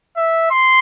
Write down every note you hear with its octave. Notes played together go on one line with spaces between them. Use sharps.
E5
C6